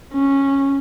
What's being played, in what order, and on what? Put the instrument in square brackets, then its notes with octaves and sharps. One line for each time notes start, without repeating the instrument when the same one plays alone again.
[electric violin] C#4